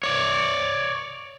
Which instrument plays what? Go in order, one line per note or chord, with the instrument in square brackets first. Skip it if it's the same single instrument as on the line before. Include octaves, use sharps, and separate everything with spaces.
[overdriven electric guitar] C#5 D5